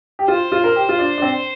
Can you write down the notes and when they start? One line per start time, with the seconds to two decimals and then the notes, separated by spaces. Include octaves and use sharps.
0.19 G4
0.28 F4 C5
0.52 F4
0.64 A#4
0.76 G4
0.89 F4
0.99 D4
1.18 D4
1.22 C4